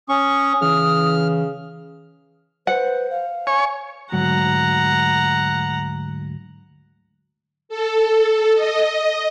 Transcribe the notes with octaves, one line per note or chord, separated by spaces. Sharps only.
C#4 C#6 D#6
C#3 E3 F6
B4 C5 F#5
F5
C#5 G#5
D2 G#2 F#3 F#5 A#5
A4
D#5